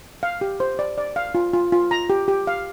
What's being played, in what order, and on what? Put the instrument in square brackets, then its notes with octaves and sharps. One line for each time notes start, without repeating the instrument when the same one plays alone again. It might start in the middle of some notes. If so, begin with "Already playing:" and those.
[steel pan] F5
G4
C5
D5
D5
F5
F4
F4
F4
A#5
G4
G4
F5